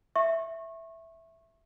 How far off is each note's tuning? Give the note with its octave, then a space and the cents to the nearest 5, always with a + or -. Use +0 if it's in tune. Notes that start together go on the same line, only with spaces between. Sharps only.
E5 +0 C#6 -30